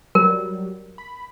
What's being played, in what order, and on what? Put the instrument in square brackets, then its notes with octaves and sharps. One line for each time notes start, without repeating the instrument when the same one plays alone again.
[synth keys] F#3 G3 [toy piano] A#4
[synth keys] B5